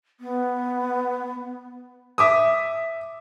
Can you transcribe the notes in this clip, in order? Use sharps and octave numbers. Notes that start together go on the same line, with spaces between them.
B3
E5 D6 D#6